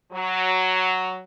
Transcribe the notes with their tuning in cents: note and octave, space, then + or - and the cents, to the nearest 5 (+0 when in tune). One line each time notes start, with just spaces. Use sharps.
F#3 +5